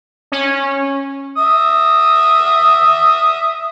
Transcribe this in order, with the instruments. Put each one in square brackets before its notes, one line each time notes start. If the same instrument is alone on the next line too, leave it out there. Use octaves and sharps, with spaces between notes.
[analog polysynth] C#4
[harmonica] E5 D#6